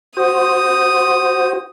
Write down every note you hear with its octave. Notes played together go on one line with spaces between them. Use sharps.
F#4 C5 D#6